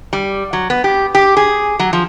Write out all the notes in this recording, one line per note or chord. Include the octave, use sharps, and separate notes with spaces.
G3
F#3
B3
G4
G4
G#4
F#3
F3